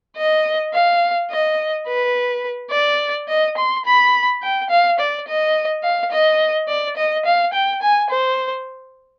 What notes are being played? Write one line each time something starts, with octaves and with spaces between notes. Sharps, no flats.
D#5
F5
D#5
B4
D5
D#5
C6
B5
G5
F5
D5
D#5
F5
D#5
D5
D#5
F5
G5
G#5
C5